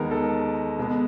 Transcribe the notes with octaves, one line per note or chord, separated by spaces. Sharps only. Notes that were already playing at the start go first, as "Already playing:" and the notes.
Already playing: D#2 D#3 G#3 B3 A#4
A4
B2 G#3 B3